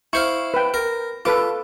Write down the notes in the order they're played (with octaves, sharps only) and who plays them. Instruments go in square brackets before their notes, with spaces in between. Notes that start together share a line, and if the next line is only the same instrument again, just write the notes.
[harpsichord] E4 C5 F5 [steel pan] C#6
[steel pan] B4 G5
[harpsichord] A#4
[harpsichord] F4 [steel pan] A4 B4 D6